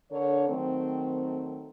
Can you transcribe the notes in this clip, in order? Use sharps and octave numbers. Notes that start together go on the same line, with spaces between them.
D3 D4 A#4 C#5
D#3 F#3 A3 C4